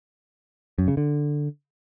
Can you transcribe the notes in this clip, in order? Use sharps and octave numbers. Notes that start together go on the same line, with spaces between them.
F#2
C#3
D3